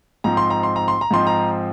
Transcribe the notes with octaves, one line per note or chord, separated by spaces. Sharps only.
G#2 F3 C4 D#4 A#5
C6
A#5
C6
A#5
C6
A#5
G#2 F3 C4 D#4 C6
A#5